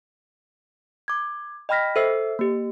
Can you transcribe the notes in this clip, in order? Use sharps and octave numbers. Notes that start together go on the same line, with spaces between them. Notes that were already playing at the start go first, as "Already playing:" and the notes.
D6 G#6
D#5 G5 B5 F6 A#6 B6
A4 C5 E5 E6 C7
A#3 G4